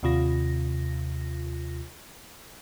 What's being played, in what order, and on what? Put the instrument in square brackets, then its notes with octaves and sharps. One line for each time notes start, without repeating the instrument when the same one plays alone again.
[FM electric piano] D#2 C3 F4 A#6